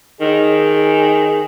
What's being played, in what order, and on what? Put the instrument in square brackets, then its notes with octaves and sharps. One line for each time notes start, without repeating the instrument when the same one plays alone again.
[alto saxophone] D#3 [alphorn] G#4